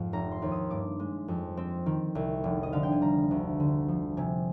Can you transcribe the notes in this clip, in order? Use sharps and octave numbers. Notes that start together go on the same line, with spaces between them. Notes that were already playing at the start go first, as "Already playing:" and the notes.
Already playing: F2 G#2 F5
F1 A#5
C6
D#2
D#6
G2 D6
G#3
F2
C4
D#3
C2
F1
D#5
D3 F5
G5
G#5
G3 A#5
D2
D3
F3
C3 G#5